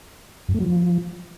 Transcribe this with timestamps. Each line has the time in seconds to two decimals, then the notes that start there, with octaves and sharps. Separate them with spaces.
0.48 F#2
0.54 A3
0.60 F#3
0.66 F3